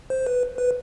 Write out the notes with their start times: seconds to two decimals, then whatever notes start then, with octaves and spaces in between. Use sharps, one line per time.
0.10 C5
0.26 B4
0.58 B4